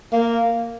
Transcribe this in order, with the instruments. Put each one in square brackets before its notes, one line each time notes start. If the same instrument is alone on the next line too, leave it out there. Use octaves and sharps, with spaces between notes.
[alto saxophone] A#3